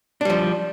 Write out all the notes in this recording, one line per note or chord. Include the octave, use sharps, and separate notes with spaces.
F3 G3 D4